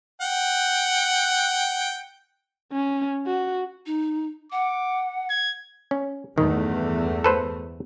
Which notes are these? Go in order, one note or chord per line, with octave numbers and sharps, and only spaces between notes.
F#5 G5
C#4
F#4
D#4
F#5 D6
G#6
C#4
E2 G2 D#3 A3
A4 B4 C5